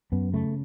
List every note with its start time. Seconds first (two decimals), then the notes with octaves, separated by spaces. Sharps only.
0.12 F#2 B3
0.34 C#3 A3